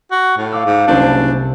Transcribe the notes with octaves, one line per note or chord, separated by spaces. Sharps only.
F#4
A2
F5 D6 E6
G#2
F#1 C2 D4 C5 C#7